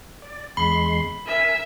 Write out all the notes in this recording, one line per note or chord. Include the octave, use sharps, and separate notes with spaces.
D5
E2 G#3 B5 C6
A#4 E5 G#5